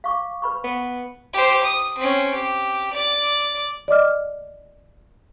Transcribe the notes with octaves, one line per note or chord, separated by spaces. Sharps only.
F5 C#6 D6
B4 B5 C#6
B3
G4 C5
D#6
C4 C#4
G4
D5
D5 D#5 D6 F6